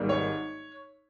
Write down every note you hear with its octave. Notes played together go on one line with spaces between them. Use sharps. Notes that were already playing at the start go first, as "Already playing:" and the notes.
Already playing: G#1 G#2 G3 A#3
C#5